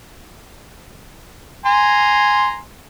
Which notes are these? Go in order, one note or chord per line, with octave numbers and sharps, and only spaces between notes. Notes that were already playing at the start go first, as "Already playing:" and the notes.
G#5 A#5 C6